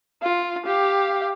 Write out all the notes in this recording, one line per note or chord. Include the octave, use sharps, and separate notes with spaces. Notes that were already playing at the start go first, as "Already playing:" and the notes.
F4
G4 F5